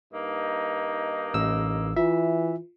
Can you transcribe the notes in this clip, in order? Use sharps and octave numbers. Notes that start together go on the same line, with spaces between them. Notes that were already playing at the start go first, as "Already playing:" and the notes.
G2 A#3 D#4
A1 E6
E3 F4 E5